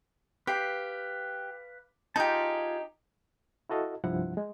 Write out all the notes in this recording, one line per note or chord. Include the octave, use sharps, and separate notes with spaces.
G4 B4 F5
D#4 F4 G4 G#4 A5
E4 F#4 A4 D#5 F5
C2 G2 F3 E4 F#5
G#3